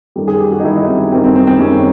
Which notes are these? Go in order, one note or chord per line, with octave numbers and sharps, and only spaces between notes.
F#2 D#3 G3 A4
G#4
G4
F#4
D#4
F#2 D#3 G3 E4
D#4
C4
F#2 D#3 G3 C4
C4
C4
C4
F#2 D#3 G3 C#4